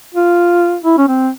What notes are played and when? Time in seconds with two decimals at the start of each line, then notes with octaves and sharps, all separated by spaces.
0.15 F4
0.84 E4
0.98 C#4
1.08 C4